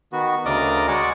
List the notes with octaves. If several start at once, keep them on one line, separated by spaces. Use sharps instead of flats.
D#3 B3 F#4
D2 C#3 A#4 D5 D#5 D6
G#3 F#4 G#4 D5 F#5